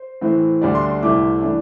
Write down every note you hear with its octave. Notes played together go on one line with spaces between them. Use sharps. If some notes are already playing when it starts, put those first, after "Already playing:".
Already playing: C5
A2 E3 C4
D2 D3 G3 D4 D5
C6
C6
C2 C3 A3 E4 D6
E3 A3 D4